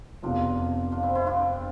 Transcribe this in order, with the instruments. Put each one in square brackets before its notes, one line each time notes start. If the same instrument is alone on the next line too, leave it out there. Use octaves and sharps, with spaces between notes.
[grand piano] F1 E2 C3 F3 [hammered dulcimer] D4 F4
[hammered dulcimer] D4 F4
C4 E4
C4 E4
D4 F4